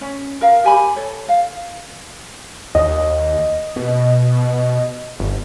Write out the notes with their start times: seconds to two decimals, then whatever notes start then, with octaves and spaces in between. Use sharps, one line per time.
0.01 C#4
0.41 A#4 F5
0.64 G4 G#5 B5
0.96 A4 C#5
1.28 F5
2.75 D#2 D#5
3.76 B2
5.20 G1